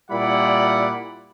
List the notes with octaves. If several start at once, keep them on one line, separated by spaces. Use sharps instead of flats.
A#2 G3 E4 D5 F#5 B5